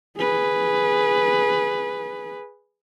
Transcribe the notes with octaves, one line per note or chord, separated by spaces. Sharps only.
G#4 B4